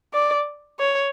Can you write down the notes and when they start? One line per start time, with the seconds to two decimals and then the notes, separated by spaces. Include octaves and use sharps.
0.14 D5
0.79 C#5